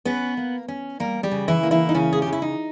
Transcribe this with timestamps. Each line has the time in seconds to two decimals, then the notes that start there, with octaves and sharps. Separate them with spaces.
0.05 B3 C#4 B4
0.37 A#3
0.68 C#4
1.00 G3 A#3 A#4
1.23 G3 G4
1.31 C#3
1.48 E3 E4
1.63 A#3
1.71 E3 E4
1.89 D#4
1.94 C#3 C#4
2.13 G#4
2.22 C#3 G4
2.32 E4
2.42 D#4